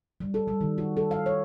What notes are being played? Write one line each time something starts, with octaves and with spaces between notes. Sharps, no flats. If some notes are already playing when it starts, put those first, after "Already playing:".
G3
A4
G3
D#3
F#4
A4
F5
C#5